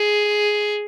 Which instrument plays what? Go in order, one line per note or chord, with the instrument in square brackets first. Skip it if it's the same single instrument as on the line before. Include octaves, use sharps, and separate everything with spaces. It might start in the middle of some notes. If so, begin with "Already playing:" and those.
Already playing: [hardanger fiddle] G#4